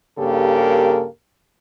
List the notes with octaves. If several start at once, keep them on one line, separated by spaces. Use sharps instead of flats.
G2 C#3 A#3 G4 A4 A#4